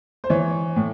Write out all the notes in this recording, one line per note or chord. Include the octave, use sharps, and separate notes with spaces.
C5
E3 C#5
A2